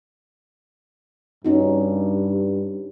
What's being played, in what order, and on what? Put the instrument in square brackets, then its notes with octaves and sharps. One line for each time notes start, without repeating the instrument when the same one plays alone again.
[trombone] G2 [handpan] C#4 D#4 F#4